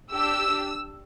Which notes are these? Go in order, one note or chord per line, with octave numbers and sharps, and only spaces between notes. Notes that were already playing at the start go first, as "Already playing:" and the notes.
D4 G4 E6